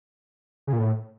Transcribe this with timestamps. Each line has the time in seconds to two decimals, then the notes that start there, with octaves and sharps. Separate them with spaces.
0.67 C#3
0.73 A#2
0.78 A2